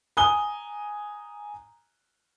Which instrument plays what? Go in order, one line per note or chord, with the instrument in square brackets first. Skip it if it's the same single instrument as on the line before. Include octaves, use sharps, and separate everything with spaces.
[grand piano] G#5 A#5 D#6 G7